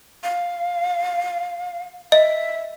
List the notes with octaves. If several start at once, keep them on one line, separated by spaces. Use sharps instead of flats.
F5
D#5 E5